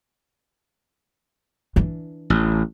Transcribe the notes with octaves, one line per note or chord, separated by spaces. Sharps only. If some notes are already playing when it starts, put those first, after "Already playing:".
E3 D4
A1